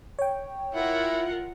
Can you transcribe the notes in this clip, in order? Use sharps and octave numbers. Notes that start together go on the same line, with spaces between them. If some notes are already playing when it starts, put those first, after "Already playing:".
C#5 G5
E4 F4 A#4 F#5